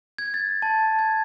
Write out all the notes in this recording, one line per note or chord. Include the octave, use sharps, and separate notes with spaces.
G#6
A6
A5
G#6